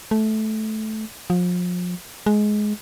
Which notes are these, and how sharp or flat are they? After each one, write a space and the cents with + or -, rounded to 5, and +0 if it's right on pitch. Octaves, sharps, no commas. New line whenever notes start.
A3 -15
F3 +35
G#3 +15